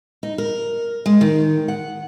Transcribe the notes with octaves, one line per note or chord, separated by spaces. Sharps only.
D#4
A#4
G#3
D#3
F#5